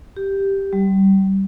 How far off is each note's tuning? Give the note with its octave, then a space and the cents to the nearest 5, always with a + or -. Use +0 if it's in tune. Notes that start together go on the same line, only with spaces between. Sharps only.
G4 +0
G3 -25